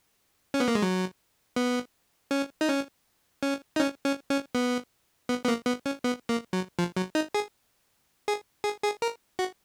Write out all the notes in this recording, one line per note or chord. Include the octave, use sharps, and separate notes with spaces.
C#4
B3
A#3
G#3
F#3
B3
C#4
D#4
C#4
C#4
D#4
C#4
C#4
C#4
B3
B3
B3
A#3
B3
C#4
B3
A#3
F#3
F3
F#3
D#4
G#4
G#4
G#4
G#4
A#4
F#4